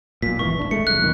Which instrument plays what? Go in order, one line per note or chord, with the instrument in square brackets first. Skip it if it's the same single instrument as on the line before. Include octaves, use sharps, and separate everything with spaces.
[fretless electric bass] B1 A#2 [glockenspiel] B6
[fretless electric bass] G#1 E2 E3 [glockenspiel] C#6
[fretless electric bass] D#1 G2 D4
[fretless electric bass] G#3 A3 [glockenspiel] C#7
[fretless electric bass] C2 F2 [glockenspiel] F#6
[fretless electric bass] D#1 E2 D#3